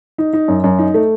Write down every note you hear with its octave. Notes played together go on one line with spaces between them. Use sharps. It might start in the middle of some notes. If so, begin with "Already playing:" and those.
D#4
D#4
F#2
F#2
D#4
A3